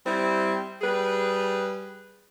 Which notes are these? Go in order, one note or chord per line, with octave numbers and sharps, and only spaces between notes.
G3 C4 E4
G3 G#4 B4